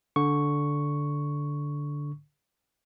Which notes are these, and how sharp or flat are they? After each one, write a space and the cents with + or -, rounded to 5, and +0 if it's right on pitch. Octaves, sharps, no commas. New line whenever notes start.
D3 -10 C#6 +0